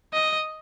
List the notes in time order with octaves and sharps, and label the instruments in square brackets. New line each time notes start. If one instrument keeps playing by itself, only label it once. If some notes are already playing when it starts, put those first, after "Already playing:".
[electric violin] D#5